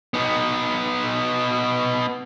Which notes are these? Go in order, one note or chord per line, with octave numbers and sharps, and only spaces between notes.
B3 D#4